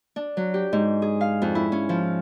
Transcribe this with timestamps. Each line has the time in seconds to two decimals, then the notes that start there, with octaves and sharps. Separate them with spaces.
0.16 D4
0.37 F#3
0.54 G4
0.73 G#2
1.02 G#4
1.21 F5
1.42 F2
1.55 E4
1.72 C#4
1.89 F3